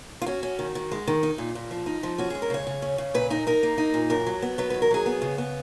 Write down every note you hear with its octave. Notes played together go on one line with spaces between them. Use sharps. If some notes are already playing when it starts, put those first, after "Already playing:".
F4
C#4 F#4
C#4
D#3
D#3
G#3
D#3
D#4
A#2
A#2
F3
D#4
F3
C#4 F#4
G#4
G#3
A#4
C#3 C#5
C#3
C#4
C#3
A#2 B4
D#4 A#4
D#4 A#4
A#3
D#4
A#2
F#2 A#4
F#3
B3
F#3 B4
B4
D#3
A#4
F#3 G#4
B3
C#3
B3